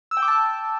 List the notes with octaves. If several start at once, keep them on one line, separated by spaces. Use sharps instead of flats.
E6
G5
D6
A5